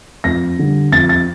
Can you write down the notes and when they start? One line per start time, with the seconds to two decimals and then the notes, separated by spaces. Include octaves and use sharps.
0.24 F2 A#6
0.59 D3 G3
0.92 F2 A6
1.09 A6